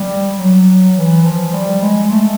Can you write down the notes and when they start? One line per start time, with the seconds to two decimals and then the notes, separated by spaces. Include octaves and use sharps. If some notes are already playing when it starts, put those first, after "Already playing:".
Already playing: G3
0.38 F#3
0.95 E3
1.25 F3
1.53 G3
1.82 G#3
2.11 A3